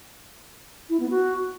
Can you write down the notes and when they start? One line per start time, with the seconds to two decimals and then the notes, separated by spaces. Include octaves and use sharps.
0.89 E4
1.00 B3
1.10 F#4